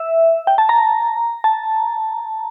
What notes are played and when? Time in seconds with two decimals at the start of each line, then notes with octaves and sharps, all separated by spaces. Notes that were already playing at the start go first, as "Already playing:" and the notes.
Already playing: E5
0.47 G5
0.58 A5
0.69 A#5
1.44 A5